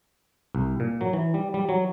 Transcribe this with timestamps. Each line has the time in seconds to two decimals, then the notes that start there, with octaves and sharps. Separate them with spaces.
0.55 C2
0.80 A#2
1.01 F#3
1.13 E3
1.34 G3
1.54 G3
1.69 F#3